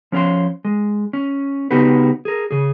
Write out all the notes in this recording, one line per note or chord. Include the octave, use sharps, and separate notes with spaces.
F3 C#4 C#5 F5 C6
G#3
C#4
C#3 B3 D#4 F#4 G4 B4
G#4 A#4
C#3 G#4